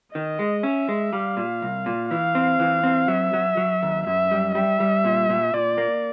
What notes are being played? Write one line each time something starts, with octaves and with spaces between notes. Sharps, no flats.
D#3 D#5
G#3
C#4 E5
G#3
G3 F5
A#2
C2
A#2
E3 F5
C4
E3
C4
F#3 E5
F#3
F#3
D#2
F#2 E5
G3
G3 E5
G3
A#2
A#2
A#2 D5
A#3